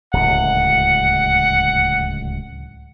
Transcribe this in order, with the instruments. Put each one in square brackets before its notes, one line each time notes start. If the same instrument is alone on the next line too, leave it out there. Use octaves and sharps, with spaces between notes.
[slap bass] D1 C#2 [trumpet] F#5